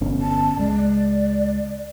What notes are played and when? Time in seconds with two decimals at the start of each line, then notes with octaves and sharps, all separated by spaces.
0.01 G1 B2 C#4
0.21 A5
0.59 C#2 G#3 D5